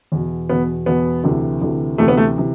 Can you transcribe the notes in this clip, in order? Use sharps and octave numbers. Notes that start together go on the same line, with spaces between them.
E2 B2
E2 B2 B3
E2 B2 B3
D2 C3 E3
D2 C3 E3
D2 C3 E3 A3
B3
A3
C3 E3